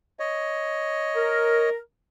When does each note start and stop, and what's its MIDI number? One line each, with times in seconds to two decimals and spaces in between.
0.19 1.70 73
0.19 1.70 75
1.15 1.77 70